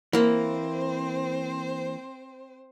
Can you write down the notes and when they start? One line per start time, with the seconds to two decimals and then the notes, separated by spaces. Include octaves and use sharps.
0.13 E3 A#3 C4 C5